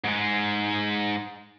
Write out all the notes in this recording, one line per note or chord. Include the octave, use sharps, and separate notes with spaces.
G#2 G#3